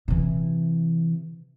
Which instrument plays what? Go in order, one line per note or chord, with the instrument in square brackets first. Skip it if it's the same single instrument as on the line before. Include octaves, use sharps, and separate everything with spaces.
[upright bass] C3 E3